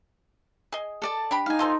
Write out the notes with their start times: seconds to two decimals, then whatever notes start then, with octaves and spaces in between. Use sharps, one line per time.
0.72 G#4 D#5
1.02 A4 D5 A5
1.31 D4 G4 B5
1.46 D#4 F5 G#5
1.59 F4 A4 C5